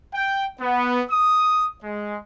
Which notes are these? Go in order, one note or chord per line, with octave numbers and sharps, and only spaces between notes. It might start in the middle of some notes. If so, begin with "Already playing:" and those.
G5
B3
D#6
G#3